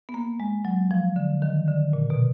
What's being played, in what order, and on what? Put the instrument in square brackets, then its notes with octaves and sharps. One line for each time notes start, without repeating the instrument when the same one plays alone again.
[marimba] B3
A#3
G#3
F#3
F3
D3
D#3
D3
A#2
B2